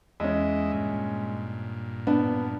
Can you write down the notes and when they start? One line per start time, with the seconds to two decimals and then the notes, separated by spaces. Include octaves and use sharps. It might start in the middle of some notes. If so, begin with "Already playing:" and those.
0.20 E2 G#3 C#4 D#5 E5
0.72 G2 A#2
2.07 B3 D4